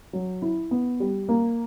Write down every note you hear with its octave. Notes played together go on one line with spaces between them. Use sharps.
F#3
E4
B3
G3
A#3